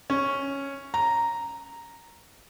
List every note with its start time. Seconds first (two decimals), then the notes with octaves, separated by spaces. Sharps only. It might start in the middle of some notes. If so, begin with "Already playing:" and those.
0.10 C#4
0.94 A#5